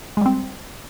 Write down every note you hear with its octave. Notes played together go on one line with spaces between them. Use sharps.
G3 G#3 C4